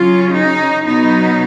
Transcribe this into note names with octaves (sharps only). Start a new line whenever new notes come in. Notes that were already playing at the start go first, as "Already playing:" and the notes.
Already playing: C#3 F#3 C#4 F4
D#4
B2 F#3 B3 D#4